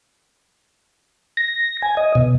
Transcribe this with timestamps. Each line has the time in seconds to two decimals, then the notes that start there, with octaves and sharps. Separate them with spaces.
1.37 A#6
1.82 G#5
1.97 D#5
2.15 B2